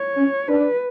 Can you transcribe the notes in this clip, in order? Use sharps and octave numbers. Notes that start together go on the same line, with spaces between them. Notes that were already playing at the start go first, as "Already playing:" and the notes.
Already playing: C#5
C#4
D4 B4